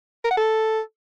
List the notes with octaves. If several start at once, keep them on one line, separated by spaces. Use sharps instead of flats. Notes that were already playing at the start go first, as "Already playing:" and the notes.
A#4
F#5
A4